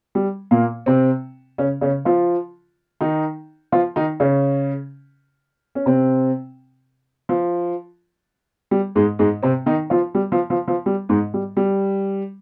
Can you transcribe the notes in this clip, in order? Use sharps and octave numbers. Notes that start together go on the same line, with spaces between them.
G3
A#2 A#3
C3 C4
C#3 C#4
C#3 C#4
F3 F4
D#3 D#4
F3 F4
D#3 D#4
C#3 C#4
C#4
C3 C4
F3
G3
G#2 G#3
G#2 G#3
C3 C4
D#3 D#4
F3 F4
G3
F3
F3
F3
G3
G#2 G#3
G3
G3